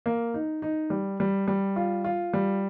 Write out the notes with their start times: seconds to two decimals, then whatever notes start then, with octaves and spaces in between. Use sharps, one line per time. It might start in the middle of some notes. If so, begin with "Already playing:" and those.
0.06 A#3
0.34 D#4
0.62 D#4
0.90 G3
1.20 G3
1.48 G3
1.76 F4
2.04 F4
2.33 G3